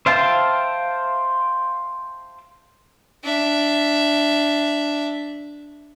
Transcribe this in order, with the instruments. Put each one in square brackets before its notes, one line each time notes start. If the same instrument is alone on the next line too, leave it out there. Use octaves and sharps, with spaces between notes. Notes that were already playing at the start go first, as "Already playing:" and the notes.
[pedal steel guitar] C5 E5 F5 G5 A5
[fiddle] D4 E5